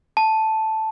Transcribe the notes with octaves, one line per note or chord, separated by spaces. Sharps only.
A5